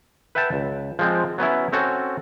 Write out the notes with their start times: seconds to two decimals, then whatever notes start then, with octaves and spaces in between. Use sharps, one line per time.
0.35 B4 E5 F#5 G5 A5
0.53 C#2
0.99 F3 G#3 C4
1.38 F#3 B3 C#4 E4
1.72 C4 C#4 F#4 A4